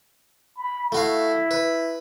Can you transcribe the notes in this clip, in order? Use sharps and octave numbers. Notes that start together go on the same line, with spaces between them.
B5
A3 E4 F#4 F5
B4